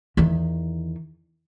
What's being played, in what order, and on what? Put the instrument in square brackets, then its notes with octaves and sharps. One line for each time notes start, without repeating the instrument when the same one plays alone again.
[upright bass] E2 D#3